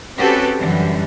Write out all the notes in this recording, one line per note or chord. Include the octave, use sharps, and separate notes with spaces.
C4 C#4 F#4 G4 A4 B4
F#2 D3 E3 G3